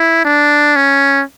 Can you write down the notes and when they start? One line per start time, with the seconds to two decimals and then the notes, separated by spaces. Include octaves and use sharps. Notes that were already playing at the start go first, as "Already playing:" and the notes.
Already playing: E4
0.25 D4
0.76 C#4